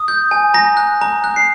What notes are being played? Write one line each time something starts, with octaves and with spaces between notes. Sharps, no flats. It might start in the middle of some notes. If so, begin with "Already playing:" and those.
Already playing: D#6
G6
G#5
A#5 A#6
F#6
A#5
F#6
C7